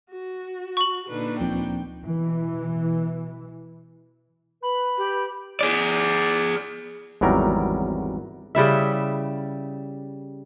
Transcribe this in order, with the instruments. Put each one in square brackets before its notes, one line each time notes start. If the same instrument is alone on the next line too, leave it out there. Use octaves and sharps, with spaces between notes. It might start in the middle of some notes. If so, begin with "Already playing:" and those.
[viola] F#4
[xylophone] C#6 F#7
[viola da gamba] A#2 D4 D#4 [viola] D3 B4
[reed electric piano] D2 F3 C4 [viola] G5
[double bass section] B2 E3
[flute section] B4 [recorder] B5
[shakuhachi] G4
[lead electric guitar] G#4 D5
[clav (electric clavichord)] G#1 E2 F#3 G3 A#4
[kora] C#3 G3 E4 E5